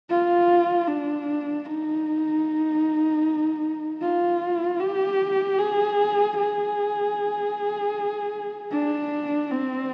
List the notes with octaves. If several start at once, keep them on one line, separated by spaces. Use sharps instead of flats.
F4
D4
D#4
F4
G4
G#4
G#4
D4
C4